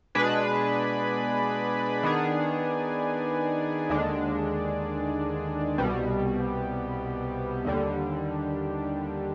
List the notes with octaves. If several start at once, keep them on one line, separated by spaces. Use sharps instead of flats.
B2 G#3 D4 G#4 B4
D#3 B3 D4 G#4
D#2 D3 G#3 D4
C2 B2 G3
D#2 D3 G3